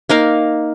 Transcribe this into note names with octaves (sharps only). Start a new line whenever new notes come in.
A#3 D#4 A#4 F5